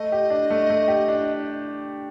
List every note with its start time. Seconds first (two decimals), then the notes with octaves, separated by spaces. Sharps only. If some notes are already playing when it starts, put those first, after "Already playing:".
Already playing: A3 D#5
0.12 G4
0.30 D4
0.50 A3
0.70 A3
0.88 G4
1.08 D4